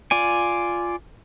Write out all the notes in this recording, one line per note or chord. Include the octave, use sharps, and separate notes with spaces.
F4 D5 G#5